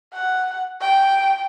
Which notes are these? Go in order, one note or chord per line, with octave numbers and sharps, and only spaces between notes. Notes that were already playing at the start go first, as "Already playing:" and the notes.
F#5
G5